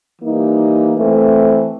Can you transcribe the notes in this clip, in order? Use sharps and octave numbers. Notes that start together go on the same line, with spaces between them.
E3 G3 A#3 D#4
E3 A3 C4